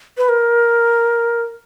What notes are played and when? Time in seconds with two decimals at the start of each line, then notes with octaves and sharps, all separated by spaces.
0.18 B4
0.29 A#4